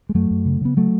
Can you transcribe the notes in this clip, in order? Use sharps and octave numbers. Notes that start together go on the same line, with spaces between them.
G#3
F#2 F#3 A3
F#2
C#3
C#3 B3
F#3 A3